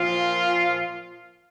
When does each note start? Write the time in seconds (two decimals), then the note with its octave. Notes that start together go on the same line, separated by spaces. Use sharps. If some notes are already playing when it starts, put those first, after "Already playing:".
Already playing: A#2 F3 F4